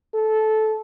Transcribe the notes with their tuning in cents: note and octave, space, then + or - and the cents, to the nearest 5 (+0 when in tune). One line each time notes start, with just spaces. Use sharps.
A4 -15